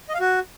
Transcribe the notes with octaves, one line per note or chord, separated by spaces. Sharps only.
D#5
F5
F#4